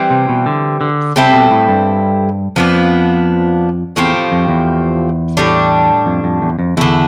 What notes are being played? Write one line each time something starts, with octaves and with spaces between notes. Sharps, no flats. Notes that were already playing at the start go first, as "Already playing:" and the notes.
Already playing: E3 G3 C4
C3
B2
D3
D3
C3 G3 C4 E4 A4
B2
A2
G2
F2 F3 B3 D4
E2 A2 F3 C4 G4
F2
E2
A2 G3 D4
F2
F2
E2
F2
E2 D3 A3 E4